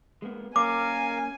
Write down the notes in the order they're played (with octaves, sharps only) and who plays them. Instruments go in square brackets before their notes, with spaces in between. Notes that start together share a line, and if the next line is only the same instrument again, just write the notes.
[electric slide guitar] G#3 A#3 B3
[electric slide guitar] A#3 C#4 [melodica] A#4 F5 [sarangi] G#5 [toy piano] D6